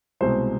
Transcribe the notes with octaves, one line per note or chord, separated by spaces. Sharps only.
C2 B2 G#3 C4 C5